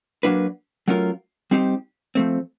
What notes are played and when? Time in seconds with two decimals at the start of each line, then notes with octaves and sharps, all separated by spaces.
0.23 F#3 A#3 D4 F#4 B4
0.88 F#3 A3 C#4 F4 A#4
1.51 G3 C4 D#4 G4 C5
2.15 F3 A3 C4